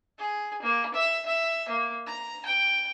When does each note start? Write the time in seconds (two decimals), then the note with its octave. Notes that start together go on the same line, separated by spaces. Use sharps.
0.18 G#4
0.62 A#3
0.94 E5
1.26 E5
1.69 A#3
2.06 A#5
2.46 G5